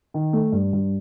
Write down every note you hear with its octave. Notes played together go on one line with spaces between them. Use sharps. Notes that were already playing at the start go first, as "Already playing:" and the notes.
D#3
A3
G2
G2